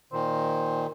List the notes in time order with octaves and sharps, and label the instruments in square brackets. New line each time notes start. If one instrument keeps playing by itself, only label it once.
[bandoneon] A#2 D#3 [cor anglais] C5